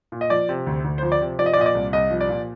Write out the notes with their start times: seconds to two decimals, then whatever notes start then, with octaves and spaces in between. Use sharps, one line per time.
0.12 A#2
0.21 D#5
0.30 F3 D5
0.49 C3
0.67 D2
0.84 D2
0.98 C5
1.03 F3
1.12 D5
1.21 C3
1.39 F3 D5
1.46 D#5
1.53 D5
1.57 A#2 D#5
1.66 D5
1.75 C2
1.93 C2 D#5
2.11 F3
2.21 D5
2.29 A#2